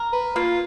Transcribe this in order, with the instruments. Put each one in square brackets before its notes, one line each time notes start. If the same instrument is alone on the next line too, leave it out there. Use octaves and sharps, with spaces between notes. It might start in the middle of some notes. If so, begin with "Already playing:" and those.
Already playing: [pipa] A#4
[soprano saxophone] B4
[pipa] A#3 [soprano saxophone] F4